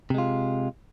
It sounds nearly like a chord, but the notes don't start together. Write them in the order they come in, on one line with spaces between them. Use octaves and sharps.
C3 G#3 F4